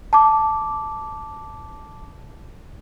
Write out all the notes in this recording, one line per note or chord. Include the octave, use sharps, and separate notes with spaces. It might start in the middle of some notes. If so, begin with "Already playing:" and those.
A5 D6